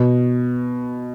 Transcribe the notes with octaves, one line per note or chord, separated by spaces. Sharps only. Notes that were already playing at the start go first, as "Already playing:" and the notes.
Already playing: B2